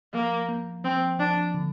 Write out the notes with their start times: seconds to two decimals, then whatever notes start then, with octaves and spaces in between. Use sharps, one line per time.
0.13 F3 A#3
0.49 A#3
0.84 F3 C4
1.19 F3 D4
1.54 D3